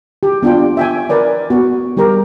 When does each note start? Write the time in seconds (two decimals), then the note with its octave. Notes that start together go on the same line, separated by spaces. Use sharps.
0.23 G4
0.43 B3 D4 F4 G5
0.77 E5 G5 G#5
1.09 A#4 B4 D5 G#5
1.50 B3 F#4
1.97 G3 G4 G#4 A#4 A#5